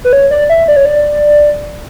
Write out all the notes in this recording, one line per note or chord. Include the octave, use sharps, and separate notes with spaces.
B4
C#5
D5
E5
D5
C#5
D5